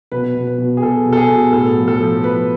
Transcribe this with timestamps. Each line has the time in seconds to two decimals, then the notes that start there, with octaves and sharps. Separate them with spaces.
0.12 B2 B4
0.35 B2
0.47 B4
0.58 B2
0.77 G#4
0.83 B2 A4
1.06 B2
1.13 A4
1.17 G#4
1.30 B2
1.53 A2 A4
1.77 F3
1.88 A4
2.00 F3
2.24 F3 B4